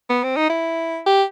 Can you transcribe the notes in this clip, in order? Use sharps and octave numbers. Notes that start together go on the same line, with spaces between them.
B3
C4
D#4
E4
G4